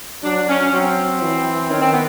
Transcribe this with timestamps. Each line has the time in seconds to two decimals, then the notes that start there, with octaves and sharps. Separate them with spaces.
0.23 F#3 D4
0.49 C#4
0.66 C#4
0.73 F#3 C4
1.22 E3
1.70 D#3 C#4
1.80 C4
1.92 B3